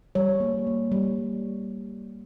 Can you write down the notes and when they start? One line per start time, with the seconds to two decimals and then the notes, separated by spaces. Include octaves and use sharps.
0.15 G3 C#5
0.40 A#3
0.67 A#3
0.92 G3